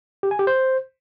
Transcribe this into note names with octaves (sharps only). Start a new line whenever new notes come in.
G4
G#5
G4
C5